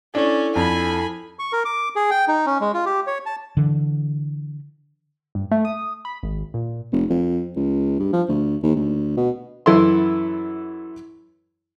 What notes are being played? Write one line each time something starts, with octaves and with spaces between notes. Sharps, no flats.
C#4 D4 E4 A4
F2 G#5 B5
C#6
A#4
D6
G#4
G5
D#4
C#4
G#3
F4
G4
C#5
A5
D3 E3
G2
A3
D#6
B5
G#1
A#2
F1
F2
C#2
G2
F3
D2
D#2
D2
B2
F#2 E3 E4 A4 E5 C6